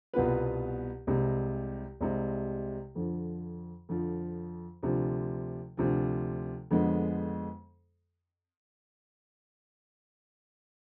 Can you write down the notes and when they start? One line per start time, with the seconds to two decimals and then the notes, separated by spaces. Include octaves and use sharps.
0.14 C2 B2 B3 F4 B4
1.07 C2 C3 G#3
2.01 C2 C3 G#3
2.95 F2 D3 F3
3.89 F2 D3 F3
4.83 D2 C3 F3
5.77 D2 C3 F3
6.71 F2 D3 G#3 B3